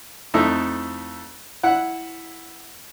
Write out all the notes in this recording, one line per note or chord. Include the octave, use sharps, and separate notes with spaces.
F2 A3 D#4 E4 A4
E4 F#5